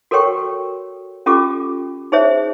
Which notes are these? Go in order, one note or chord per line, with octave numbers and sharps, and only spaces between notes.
F#4 A4 A#4 C#5 G5 C#6
C#4 F4 G4 A4 D6
D#4 G#4 C5 C#5 E5